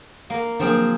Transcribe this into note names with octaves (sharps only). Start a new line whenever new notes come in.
A#3
D3 F3 F#3 A#3 C4 G#4